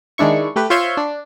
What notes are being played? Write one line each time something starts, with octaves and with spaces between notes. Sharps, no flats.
D#3 G#3 D4 E4 C#6
A3 G4 B4
F4 C5 C#5 E5 C6 C#6
D4